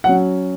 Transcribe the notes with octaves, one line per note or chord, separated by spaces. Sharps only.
F#3 C#4 F#5